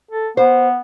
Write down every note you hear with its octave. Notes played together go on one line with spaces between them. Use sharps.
A4
B3 C5